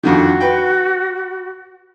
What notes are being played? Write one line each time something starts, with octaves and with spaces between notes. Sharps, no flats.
F2 D3 D#3 F#4
B4 G5